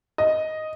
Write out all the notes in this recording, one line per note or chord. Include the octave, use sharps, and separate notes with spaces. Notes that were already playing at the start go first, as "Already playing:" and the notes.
D#5